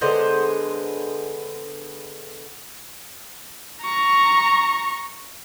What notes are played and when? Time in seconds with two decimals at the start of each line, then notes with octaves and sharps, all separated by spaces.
0.01 D3 G#3 B3 C5
3.82 A#5 C#6